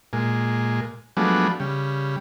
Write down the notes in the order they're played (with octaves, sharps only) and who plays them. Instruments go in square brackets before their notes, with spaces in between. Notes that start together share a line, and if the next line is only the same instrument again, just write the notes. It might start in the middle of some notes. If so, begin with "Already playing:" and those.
[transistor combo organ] A#2 G#3
F3 F#3 G#3 A3 B3 D4
C#3 G3